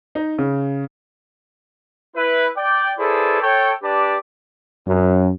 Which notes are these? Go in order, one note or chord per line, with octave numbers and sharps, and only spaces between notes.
D#4
C#3
E4 B4
D5 G5
E4 G#4 A4 B4 C5 D5
A4 C#5 G5
D4 G4 B4 D5 A5 D6
F#2